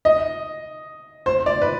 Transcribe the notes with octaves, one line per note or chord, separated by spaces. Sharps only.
D#5
C5
D5
B4